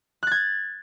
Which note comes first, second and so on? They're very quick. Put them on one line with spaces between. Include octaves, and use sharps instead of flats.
F#6 A6 G#6